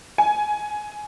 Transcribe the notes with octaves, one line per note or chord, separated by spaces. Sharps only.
G#5